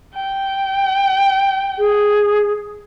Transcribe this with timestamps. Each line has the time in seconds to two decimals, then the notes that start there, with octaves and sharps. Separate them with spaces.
0.14 G5
1.79 G#4